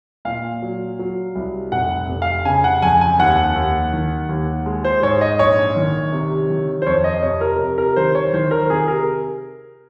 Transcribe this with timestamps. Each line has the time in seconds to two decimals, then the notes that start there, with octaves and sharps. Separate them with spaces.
0.25 A#2 F5
0.62 F#3
0.99 F#3
1.35 C2
1.72 F1 F#5
2.09 F1
2.22 F5
2.45 C#3 G#5
2.64 F#5
2.82 F2 G#5
3.01 G#5
3.19 D#2 F#5
3.56 D#2
3.93 D#3
4.29 D#2
4.66 G#3
4.85 C5
5.03 G#2 C#5
5.21 D#5
5.39 A#1 C#5
5.76 D#3
6.12 C3
6.50 D#3
6.82 C5
6.86 F2 C#5
7.04 D#5
7.22 C3 C#5
7.41 A#4
7.59 C3
7.78 A#4
7.96 D#3 C5
8.15 C#5
8.33 D#3 C5
8.51 A#4
8.69 C3 G#4
8.88 A#4